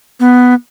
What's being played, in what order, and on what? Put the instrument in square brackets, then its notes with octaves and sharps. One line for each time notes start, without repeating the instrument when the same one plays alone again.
[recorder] B3